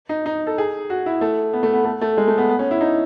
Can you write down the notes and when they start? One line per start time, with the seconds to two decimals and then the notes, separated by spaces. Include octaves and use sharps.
0.09 D#4
0.26 D#4
0.47 A4
0.58 G#4
0.90 F#4
1.06 E4
1.21 A3
1.53 B3
1.63 A3
1.73 B3
1.85 A3
2.01 A3
2.17 G#3
2.28 A3
2.38 B3
2.49 B3
2.59 C#4
2.71 E4
2.81 D#4